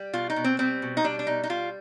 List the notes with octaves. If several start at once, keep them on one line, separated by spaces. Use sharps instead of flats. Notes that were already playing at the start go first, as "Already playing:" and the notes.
Already playing: G3
B2 F4
D#4
B2
C4
G3 C4
B2
D#4
G3 D4
D4
B2 D#4
D#4
G3 F4